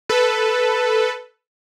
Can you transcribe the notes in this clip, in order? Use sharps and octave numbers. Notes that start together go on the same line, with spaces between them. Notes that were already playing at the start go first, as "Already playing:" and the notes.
A4 B4